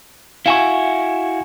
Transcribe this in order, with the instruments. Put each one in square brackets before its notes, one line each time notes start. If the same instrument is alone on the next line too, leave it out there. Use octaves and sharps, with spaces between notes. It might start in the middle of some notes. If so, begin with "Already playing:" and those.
[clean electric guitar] E4 F#4 E5 [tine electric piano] F5 G#5 C#6